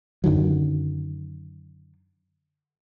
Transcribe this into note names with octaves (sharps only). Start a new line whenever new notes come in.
F#2 D3 D#3 F#3